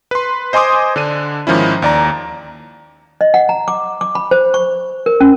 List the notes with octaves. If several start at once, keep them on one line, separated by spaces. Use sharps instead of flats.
B4 C6
C5 D#5 G#5 C6 D6 D#6
D3 D4 D#7
G#2 D#3 F3 C#4 E4
D#2 D5 A#5
D#5
F#5
A#5
D6
D6
B5
C5
C#6
A#4
C#4